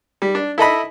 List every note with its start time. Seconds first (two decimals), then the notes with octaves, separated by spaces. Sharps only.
0.22 G3
0.35 D4
0.58 E4 A4 D#5 B5